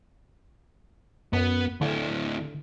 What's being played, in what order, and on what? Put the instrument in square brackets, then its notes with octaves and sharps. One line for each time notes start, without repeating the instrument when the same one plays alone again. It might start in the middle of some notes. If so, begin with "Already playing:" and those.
[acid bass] F#2 [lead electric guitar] B3
[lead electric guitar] D2 E4 [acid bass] D3